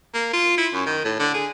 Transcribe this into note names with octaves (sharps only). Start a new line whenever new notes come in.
A#3
F4
E4
F#2
D#3
A2
D3
G#4